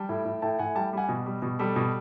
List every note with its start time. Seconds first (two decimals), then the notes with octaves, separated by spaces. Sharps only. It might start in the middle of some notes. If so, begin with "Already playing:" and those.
Already playing: G3 G5 A5
0.09 A2
0.25 A2
0.42 A2 G5 A5
0.59 A2 F#5 G#5
0.75 G3 G5 A5
0.93 G3 F#5 G#5
1.09 B2
1.26 G3
1.42 B2
1.59 G3 A4
1.76 B2